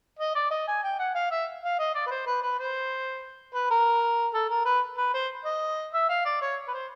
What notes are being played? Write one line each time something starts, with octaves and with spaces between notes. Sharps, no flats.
D#5
D5
D#5
G#5
G5
F#5
F5
E5
F5
D#5
D5
B4
C5
B4
B4
C5
B4
A#4
A4
A#4
B4
B4
C5
D#5
E5
F5
D5
C#5
B4
C5